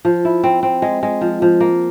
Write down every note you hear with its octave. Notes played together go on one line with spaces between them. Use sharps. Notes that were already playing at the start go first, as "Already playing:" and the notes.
F3
E4
C4
C4
G#3
G#3
F3
F3
A#3